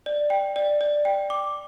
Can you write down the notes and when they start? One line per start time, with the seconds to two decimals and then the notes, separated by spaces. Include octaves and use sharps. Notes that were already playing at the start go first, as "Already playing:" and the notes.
0.06 D5
0.30 G5
0.56 D5
0.81 D5
1.05 G5
1.30 D6